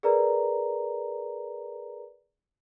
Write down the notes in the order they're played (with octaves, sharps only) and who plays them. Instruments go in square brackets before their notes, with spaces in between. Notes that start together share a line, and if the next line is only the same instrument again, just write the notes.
[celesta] G#4 A#4 B4 D5 A#5